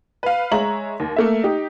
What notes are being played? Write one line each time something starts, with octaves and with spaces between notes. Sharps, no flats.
B4 F5
G#3 C#5 E5 A#5 F#7
D#2
A3 A#3 E5
D#4 G4